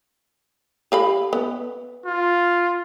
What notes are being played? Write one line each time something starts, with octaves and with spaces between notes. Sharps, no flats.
G4 F5 B5
B3
F4